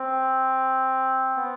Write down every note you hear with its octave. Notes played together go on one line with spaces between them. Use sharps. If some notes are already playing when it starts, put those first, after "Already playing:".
Already playing: C4
B3